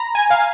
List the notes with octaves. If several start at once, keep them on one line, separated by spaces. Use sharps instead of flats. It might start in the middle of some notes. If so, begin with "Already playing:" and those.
Already playing: A#5 B5
G#5
F5